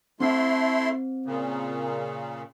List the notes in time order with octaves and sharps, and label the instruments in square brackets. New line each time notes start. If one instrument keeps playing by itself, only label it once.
[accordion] A3 E4 C6 [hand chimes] C4
[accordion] A#2 C#3